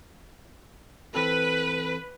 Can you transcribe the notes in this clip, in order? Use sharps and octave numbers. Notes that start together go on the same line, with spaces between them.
E3 C4 A4 B4